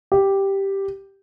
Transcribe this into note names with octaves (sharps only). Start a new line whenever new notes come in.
G4